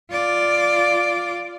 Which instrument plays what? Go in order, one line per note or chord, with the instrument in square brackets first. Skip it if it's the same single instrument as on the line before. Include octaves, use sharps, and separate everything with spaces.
[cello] F4 D5